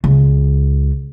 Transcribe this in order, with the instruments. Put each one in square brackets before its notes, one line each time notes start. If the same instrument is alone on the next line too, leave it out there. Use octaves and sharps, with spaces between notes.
[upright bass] C#2